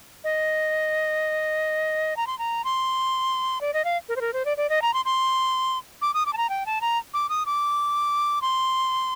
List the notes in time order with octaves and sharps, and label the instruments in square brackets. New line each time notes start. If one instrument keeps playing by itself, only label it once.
[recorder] D#5
A#5
C6
A#5
C6
D5
D#5
F5
A#4
C5
A#4
C5
D5
D5
D#5
A#5
C6
C6
D6
D#6
D6
A5
A#5
G5
A5
A#5
D6
D#6
D6
C6